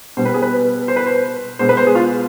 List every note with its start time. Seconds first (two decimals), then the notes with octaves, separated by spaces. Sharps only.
0.17 B2 G3 B3 C5
0.25 B4
0.34 G#4
0.42 B4
0.88 C5
0.96 B4
1.06 C5
1.59 B2 G#3 B3 C5
1.69 B4
1.77 C5
1.87 G#4
1.95 F4